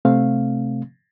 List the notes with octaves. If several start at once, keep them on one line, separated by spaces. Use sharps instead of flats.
C3 A3 C4 F5